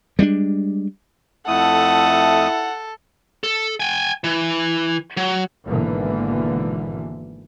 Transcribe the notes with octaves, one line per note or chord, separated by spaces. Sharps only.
G3 G#3 B3 D4
F2 A3 E4 A4 F#5 D#6
A4
G5 G#5
E3
F#3
G#1 G#2 B2 D3 E3 A#3